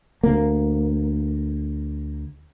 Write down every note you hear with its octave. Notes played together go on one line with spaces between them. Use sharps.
D2 A#3